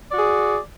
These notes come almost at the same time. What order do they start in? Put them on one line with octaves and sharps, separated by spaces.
D5 F#4 G#4